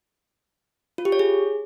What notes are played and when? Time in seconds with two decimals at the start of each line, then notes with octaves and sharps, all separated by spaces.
0.98 F4
1.05 G4
1.12 C#5
1.19 G#4